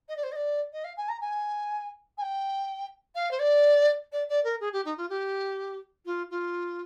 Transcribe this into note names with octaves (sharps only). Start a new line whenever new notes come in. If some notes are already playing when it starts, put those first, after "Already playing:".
D#5
D5
C5
D#5
D5
D#5
F5
G#5
A#5
G#5
G#5
G5
F5
C5
D5
D5
D5
A#4
G#4
G4
D#4
F4
G4
F4
F4